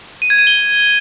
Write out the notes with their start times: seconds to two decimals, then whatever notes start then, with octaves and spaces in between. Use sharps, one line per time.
0.22 D#7
0.30 G#6
0.39 D#7
0.47 G7